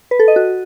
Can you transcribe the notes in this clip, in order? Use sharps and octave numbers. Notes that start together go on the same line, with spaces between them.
B4
A4
D#5
F#4